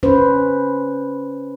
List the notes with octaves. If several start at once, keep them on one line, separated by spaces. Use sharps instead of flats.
C#4 B4 C5